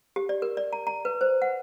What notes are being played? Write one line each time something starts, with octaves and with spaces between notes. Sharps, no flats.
G4
D5
A#4
D5
A#5
A#5
B4
C5
F#5